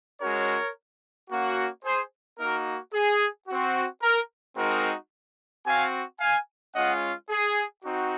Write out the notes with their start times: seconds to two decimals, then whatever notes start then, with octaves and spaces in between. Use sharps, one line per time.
0.21 G#3 C#4 F#4 A#4 C#5
1.30 A#3 C#4 F#4
1.84 G#4 C5
2.39 A#3 D#4 F#4 A#4
2.94 G#4
3.48 C4 F#4
4.02 A#4
4.57 G#3 C4 D#4 F#4 A#4
5.66 C4 F#4 F5 G#5
6.20 F5 G#5
6.75 G#3 C#4 F4 D#5 F#5
7.29 G#4
7.84 C4 D#4 F#4